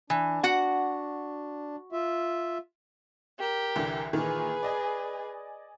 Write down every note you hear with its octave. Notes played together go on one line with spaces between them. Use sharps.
E3 D4
F#4 F#5
F4 E5
G4 A#4
C2 D3 E3
A#2 D#3 E3 G#4 B4
D5 D#5 G#5